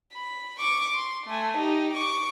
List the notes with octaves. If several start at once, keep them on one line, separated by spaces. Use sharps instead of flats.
B5
C#6 D6
C6
A3 G#5
D#4 G4
C#6 D6